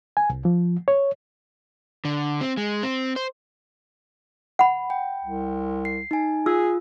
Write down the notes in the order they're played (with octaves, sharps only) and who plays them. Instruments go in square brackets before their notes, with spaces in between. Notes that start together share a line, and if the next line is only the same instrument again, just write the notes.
[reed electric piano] G#5
C2
F3
C#5
[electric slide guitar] D3
C4
G#3
C4
C5
[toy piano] F#5 B5
[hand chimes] G5
[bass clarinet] C2
[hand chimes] C7
D#4 G#5
[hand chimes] F4 [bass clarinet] G#4 [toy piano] E6